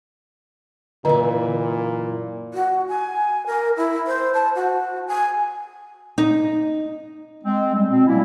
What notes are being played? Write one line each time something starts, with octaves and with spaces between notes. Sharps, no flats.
F#2 A#2 D3 E3 D#5
F#4
G#5
A#4
E4
C5
A5
F#4
G#5
D#4
G#3 C4
G3 C4
B2 C4
F#3 G3 A3 A#3 C#4 E4